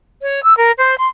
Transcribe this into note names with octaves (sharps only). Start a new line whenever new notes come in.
C#5
E6
A#4
C5
C6